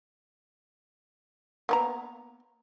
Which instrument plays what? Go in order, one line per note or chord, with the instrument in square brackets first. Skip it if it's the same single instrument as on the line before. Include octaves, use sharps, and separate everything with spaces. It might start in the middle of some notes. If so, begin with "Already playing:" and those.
[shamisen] A#3 B3 A#5